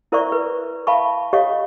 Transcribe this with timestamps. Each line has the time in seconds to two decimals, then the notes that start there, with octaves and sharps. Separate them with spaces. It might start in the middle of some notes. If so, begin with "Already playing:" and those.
0.12 E4 A#4 C5 D5 E5 C#6
0.32 A#4 B4
0.87 E5 F5 A5 B5 C#6
1.33 G4 A4 C#5 D#5 F5 C#6